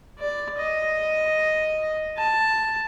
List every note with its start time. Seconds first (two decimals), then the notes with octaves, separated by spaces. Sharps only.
0.19 D5
0.58 D#5
2.17 A5